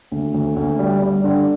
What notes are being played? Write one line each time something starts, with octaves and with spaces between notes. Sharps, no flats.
D2
D2
D2
G3
G3
D3